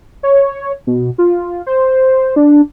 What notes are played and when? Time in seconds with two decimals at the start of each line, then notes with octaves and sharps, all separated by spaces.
0.23 C#5
0.87 B2
1.18 F4
1.67 C5
2.36 D4